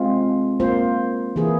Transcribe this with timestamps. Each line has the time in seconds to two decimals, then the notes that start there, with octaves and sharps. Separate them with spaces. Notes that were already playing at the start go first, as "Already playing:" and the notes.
Already playing: G#3 C4 F4
0.60 A#3 F4 C5
1.36 E3 A#3 E4 G#4